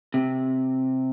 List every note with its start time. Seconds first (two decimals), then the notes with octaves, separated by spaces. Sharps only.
0.14 C3